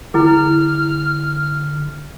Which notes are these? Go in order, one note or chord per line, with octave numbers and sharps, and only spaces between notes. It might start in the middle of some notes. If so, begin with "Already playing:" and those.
D3 E4 G#4 F6